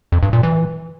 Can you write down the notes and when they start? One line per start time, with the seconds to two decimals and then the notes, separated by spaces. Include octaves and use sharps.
0.12 F2
0.23 G2
0.33 A#2
0.43 E3